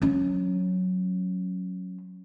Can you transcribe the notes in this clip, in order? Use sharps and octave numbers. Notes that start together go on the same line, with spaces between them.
F#3 C#4